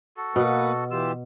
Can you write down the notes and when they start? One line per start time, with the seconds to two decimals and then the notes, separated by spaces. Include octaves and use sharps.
0.17 F#4 A4
0.36 B2 A#3 B4 F#5
0.91 E3 F4 G4 E6